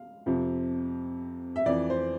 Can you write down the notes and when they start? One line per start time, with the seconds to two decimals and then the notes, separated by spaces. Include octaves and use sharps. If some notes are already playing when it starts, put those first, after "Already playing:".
Already playing: F5
0.26 F2 C3 F3
1.56 E5
1.66 F2 E3 D5
1.90 C5